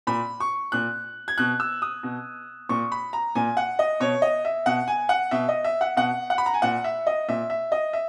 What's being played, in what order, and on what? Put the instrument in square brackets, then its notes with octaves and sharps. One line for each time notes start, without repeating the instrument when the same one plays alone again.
[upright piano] A#2 B5
C#6
A#2 F#6
G#6
B2 F#6
E6
D#6
B2
A#2 C#6
B5
A#5
A#2 G#5
F#5
D#5
B2 C#5
D#5
E5
B2 F#5
G#5
F#5
B2 E5
D#5
E5
F#5
B2 F#5
F#5
B5
A#5
G#5
A#2 F#5
E5
D#5
A#2 E5
E5
D#5
E5